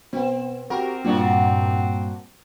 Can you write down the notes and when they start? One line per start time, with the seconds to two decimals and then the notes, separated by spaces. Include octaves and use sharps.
0.13 B2 B3 C4
0.70 C4 F#4 G4 A#4
1.05 G2 A#2 A#3 D4 F#4